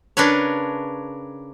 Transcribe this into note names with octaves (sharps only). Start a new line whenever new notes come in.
C#3 D4 A#4 B4 C#5